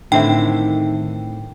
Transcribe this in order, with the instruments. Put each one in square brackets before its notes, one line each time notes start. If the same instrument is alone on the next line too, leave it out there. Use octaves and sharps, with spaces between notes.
[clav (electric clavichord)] A2 C4 [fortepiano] D3 E5 [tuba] D#3 [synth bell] G5